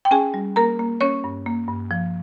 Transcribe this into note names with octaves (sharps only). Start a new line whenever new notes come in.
G5
C#4 G#4 G#5
G3
A#3 A#4 A#5
A#3
C#4 C#5 C#6
G2
A#3
G2
F3